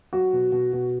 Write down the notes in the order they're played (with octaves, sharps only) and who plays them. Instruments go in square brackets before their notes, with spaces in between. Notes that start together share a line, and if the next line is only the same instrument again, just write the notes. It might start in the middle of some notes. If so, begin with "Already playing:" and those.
[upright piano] F#3 F#4
B2
B2
B2